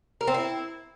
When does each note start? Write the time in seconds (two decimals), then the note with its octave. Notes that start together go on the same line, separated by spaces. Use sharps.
0.21 A#4
0.27 C4
0.34 E4